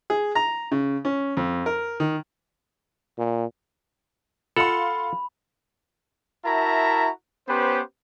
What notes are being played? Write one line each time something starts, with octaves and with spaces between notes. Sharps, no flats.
G#4
A#5
C#3
C#4
F2
A#4
D#3
A#2
F4 A4 F5 F#5 B5 C6
E4 F#4 A#4 E5 A5 A#5
B3 C#4 G4 B4 C5